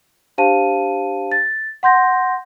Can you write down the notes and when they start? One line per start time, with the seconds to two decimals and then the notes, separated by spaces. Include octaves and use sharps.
0.38 D4 G4 C5 F5 A5 D#7
1.32 A6
1.83 F#5 C6 G6 A#6